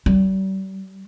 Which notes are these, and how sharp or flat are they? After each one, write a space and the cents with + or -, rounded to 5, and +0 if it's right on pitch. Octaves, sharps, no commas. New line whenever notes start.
G3 -35